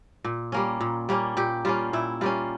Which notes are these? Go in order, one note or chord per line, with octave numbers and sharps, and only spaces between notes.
A#2
G3 A#3 C#4
A#2
G3 A#3 C#4
A#2 G4
G3 A#3 C#4 F4
A#2 E4
G3 A#3 C#4 F4